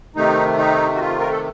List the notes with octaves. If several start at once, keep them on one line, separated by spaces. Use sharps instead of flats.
C3 D#3 A3 D#4
D#4
F#4
F4
A#4
A4